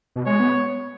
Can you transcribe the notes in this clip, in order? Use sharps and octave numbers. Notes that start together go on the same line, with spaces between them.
B2
G#3 C#5
B3